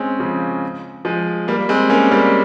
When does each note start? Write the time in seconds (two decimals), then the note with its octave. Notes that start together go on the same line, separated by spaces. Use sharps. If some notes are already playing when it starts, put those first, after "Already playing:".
Already playing: G#3 C4 C#4
0.20 C#3 F3
1.05 F3 G#3
1.48 G3 A#3
1.69 G#3 C4
1.90 A#3 C#4
2.11 G3 A#3